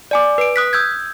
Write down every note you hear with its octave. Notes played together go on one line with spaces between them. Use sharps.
D5 G#5 D6
B4 D7
D#6 F#6 B6
D#6 E6 G6 G#6